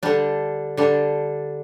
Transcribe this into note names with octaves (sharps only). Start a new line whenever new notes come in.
D3 G3 D4
D3 G3 D4